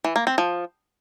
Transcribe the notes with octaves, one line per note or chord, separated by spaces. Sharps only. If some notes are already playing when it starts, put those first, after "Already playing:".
E3
A#3
C4
F3